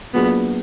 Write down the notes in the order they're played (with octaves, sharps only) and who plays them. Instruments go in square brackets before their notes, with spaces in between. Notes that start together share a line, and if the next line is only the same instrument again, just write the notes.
[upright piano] F#3 A#3 D4 F4 G#4 [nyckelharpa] B3